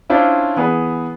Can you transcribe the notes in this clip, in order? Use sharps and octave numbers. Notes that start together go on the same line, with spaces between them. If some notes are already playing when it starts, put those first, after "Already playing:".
C#4 D4 E4 F4 C5
E3 B3 G#4 B4